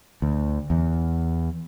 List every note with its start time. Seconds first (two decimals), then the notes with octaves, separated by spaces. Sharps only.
0.22 D2
0.70 E2